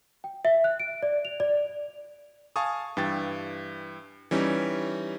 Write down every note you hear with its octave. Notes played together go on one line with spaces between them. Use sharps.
G5
E5
F#6
D7
D5
F7
D5
F5 G#5 A5 C#6 D#6
G2 E3 G5 A6
E3 G3 C#4 D#4